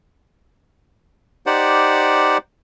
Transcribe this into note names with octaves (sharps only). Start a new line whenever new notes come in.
D#4 G4 C5 D5 F#5